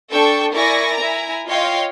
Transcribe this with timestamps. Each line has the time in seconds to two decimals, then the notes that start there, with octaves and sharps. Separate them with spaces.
0.11 D4 A4 G5 A5 C#6
0.54 E4 A#4 D5 G#5 C#6 A#6
0.95 E4 G#5 A#5
1.47 F4 C#5 D#5 F5 G5 C6